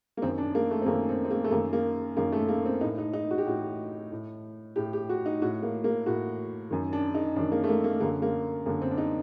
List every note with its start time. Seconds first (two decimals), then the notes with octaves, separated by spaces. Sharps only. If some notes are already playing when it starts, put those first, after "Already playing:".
0.17 A#3
0.22 F#2 D#3 C4
0.38 D4
0.55 A#3
0.71 A3
0.82 C4
0.86 F#2 D#3 A#3
1.09 C4
1.25 C4
1.31 A#3
1.44 A3
1.51 F#2 A#3
1.55 D#3
1.73 A#3
2.17 F#2 D#3 A#3
2.32 A3
2.49 A#3
2.66 C4
2.81 A2 D#4
2.98 D#4
3.13 D#4
3.31 F#4
3.38 G4
3.47 A2 F#4
4.12 A2
4.76 A2 G4
4.93 G4
5.09 F#4
5.26 D#4
5.42 A2 F#4
5.63 A#3
5.84 A#3
6.06 A2 F#4
6.70 F#2 D#3
6.93 D4
7.15 D#4
7.36 F#2 D#3 D4
7.52 A#3
7.64 A3
7.69 A#3
7.84 A#3
8.00 F#2 D3 A#3
8.22 A#3
8.66 F#2 D3 A#3
8.82 C4
8.91 D4
8.98 D#4